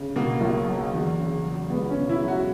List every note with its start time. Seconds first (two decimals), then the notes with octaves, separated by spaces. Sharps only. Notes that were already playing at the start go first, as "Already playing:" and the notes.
Already playing: C#3
0.16 B2 A#3
0.41 B1
0.67 F#3
0.94 E2
1.19 C#3
1.45 F#3
1.70 C#2 B3
1.90 C#4
1.96 B2
2.09 E4
2.22 F#3
2.28 F#4